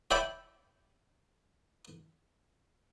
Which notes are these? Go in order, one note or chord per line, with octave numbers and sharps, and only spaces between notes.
C#5 E5 G5 A5 B5 D6